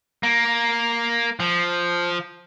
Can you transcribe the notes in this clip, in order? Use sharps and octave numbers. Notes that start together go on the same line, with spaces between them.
A#3
F3